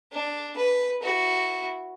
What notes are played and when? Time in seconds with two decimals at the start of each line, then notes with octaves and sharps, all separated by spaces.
0.13 D4
0.57 B4
1.02 E4 F#4